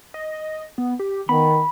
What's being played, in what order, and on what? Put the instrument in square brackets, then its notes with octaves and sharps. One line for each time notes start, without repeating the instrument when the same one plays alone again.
[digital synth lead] D#5
B3
G4
[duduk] D#3 [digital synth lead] B3 [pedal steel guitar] B5